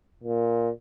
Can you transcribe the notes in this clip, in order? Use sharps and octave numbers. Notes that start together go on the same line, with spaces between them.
A#2